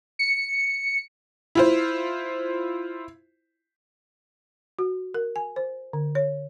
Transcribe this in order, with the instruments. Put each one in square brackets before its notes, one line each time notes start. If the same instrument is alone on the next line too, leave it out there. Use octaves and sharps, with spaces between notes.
[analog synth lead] C#7
[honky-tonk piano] E4 F4 C5
[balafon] F#4
A#4
G#5
C5
D3
C#5